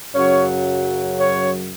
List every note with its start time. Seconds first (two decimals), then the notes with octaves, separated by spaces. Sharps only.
0.15 F#2 C#3 F#3 C#4 C#5
1.19 C#4 C#5